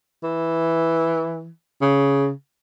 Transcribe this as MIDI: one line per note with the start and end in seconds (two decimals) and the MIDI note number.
0.23 1.50 52
1.81 2.30 49